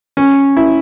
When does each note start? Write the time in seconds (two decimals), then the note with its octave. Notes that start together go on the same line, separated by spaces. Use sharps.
0.17 C#4
0.57 E4